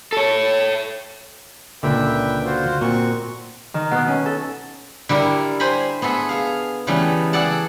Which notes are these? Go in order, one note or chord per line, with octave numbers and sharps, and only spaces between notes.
A4 C#5
C#2 A#2 D3 B4 E5 G5
F4 F#4 C5
A#2 C4 F#4 C#6
D#3
B2
C#4
A4
D3 G3 E4 A#4
C5 G#5 A#5 B5
B3 G#4 A4 E5
G#4 F5
C#3 E3 G3 A3 B3 C#4
G#4 A4 D5 F#5 A5